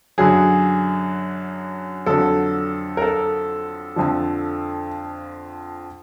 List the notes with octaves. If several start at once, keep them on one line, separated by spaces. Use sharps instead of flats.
F#2 D3 F#3 G#4
F2 D3 F#3 A4
A#4
A4
F2 D3 F3